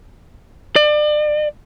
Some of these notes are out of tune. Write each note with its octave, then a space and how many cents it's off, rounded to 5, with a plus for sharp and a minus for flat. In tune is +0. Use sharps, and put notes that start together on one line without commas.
D5 +35